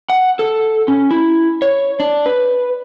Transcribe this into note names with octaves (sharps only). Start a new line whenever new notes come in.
F#5
A4
C#4
E4
C#5
D4
B4